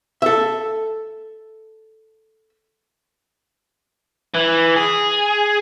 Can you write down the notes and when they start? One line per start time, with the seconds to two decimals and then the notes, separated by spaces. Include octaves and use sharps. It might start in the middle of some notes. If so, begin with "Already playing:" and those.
0.22 A4 E5
4.34 E3
4.76 G#4